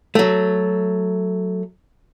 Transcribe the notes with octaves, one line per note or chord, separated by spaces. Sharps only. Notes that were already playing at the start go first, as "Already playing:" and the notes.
F#3 A3